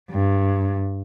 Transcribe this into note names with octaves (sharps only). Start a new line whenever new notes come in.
G2